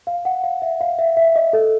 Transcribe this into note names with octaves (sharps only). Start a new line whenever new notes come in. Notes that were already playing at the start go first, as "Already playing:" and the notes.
F5
F#5
F5
E5
F5
E5
E5
D#5
A4